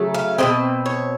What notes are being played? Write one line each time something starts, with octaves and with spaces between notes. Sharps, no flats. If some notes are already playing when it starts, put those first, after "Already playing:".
Already playing: C#3 F#3 A3
F5
B2 G#3 C4 D#5
C#5